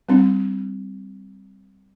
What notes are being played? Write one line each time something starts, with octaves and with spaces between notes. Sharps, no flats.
G3 C4 D4